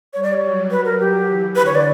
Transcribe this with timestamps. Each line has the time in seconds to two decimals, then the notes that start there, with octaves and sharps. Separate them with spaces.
0.13 G3 C#5
0.23 D5
0.33 C#5
0.42 F#3
0.71 B4
0.85 A#4
1.00 G4
1.28 E3
1.56 D3 B4
1.66 C#5
1.75 D5